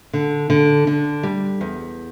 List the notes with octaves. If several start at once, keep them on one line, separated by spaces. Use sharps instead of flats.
D3
D3
D3
G3
E2